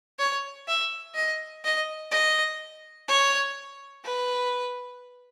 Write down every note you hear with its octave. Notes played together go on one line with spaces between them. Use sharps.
C#5
E5
D#5
D#5
D#5
C#5
B4